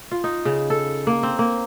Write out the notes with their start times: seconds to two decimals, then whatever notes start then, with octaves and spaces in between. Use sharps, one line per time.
0.11 F4
0.24 D#4
0.45 C#3
0.70 A4
1.07 A#3
1.23 C4
1.39 A#3